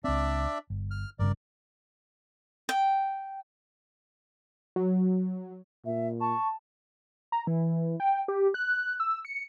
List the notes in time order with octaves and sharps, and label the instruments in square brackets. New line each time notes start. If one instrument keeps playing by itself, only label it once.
[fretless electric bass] C#2 C4 [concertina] D4 D5 E5
[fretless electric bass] G1
[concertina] F6
[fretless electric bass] G1 G2 C#3 [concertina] A#4 D5
[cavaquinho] G5
[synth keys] F#3
[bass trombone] A#2 [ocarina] E5
[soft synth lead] A5 [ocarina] C#6
[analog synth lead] A#5
E3
G5
G4
F#6
E6
C#7